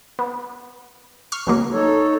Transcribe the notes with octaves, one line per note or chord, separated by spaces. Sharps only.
B3
C#6 F6 C7
C#2 F#3 A#3
D#4 A4 C#5